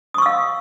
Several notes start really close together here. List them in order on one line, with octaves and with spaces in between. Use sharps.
D#6 C#6 E6 F5